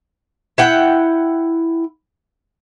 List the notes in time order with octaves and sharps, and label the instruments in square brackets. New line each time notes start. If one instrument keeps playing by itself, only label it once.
[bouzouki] E4 F#5 G5